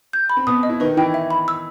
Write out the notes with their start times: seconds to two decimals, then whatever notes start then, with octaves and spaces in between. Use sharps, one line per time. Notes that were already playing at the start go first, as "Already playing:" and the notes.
0.13 G6
0.30 B5
0.37 C4
0.47 B2 B3 D#6
0.63 D#5
0.69 E4
0.80 D#3 D#4 B4
0.90 D#4
0.97 E3 E4 G5
1.14 E5
1.31 B5
1.48 E6